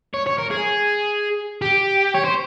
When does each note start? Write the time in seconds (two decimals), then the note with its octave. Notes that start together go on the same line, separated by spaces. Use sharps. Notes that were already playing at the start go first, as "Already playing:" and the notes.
0.14 C#5
0.27 C#5
0.38 A#4
0.51 G#4
1.62 G4
2.14 C#5
2.25 C5